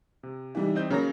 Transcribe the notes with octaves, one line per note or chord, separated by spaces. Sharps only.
C3
E3 G3 D#4
C4 D#5 G6
C#3 F#3 A#3 C#4 A#5 A#6